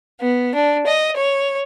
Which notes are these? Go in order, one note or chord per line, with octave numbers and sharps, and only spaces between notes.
B3
D4
D#5
C#5